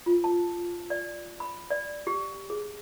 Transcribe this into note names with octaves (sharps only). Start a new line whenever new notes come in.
F4
A5
D5
B5
D5
G4
G#4